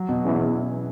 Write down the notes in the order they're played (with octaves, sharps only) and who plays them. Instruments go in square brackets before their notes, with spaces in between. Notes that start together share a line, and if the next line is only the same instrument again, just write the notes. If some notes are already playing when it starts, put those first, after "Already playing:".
Already playing: [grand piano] F#3
B2
[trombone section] E2 [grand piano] C#4
[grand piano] B2